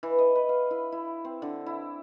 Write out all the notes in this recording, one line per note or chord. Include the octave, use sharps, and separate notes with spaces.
E3
D#5
B4
F5
E4
E4
C4
D3
E4